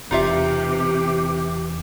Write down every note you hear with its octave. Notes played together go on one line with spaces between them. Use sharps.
E1 E2 C3 E3 D#4 F4 G4 E5